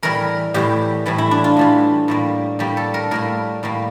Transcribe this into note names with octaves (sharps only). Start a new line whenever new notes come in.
A2 E3 G3 A#4
A2 E3 G3 G4
A2 E3 G3
E4
D4
F4
A2 E3 G3
A2 G3 A#3
A2 G3 A#3 G4
A4
A#4
A2 G3 A#3 A#4
A2 G3 A#3